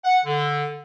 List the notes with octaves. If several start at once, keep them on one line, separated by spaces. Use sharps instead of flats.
F#5
D3